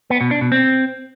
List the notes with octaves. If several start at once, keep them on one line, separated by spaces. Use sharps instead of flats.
B3
B2
D4
B2
C4